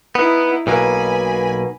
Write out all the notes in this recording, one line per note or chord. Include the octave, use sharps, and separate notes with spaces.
B3 D#4 E4
B1 B2 A#3 G#5 B5